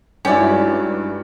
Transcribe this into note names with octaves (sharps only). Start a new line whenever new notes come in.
G2 G#3 C#4 D#4 E4 F#4 G4 D5